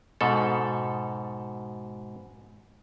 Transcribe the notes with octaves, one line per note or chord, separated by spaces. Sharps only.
G#2 B2 A4